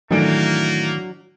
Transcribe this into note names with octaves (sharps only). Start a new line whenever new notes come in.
A2 D#3 E3 F#3 A3 A#3 D4 D7